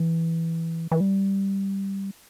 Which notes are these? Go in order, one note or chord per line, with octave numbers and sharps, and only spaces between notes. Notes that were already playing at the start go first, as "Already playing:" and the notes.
Already playing: E3
E3
G3